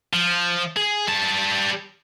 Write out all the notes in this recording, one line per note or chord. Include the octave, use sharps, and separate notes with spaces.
F3
G#4
G3 A5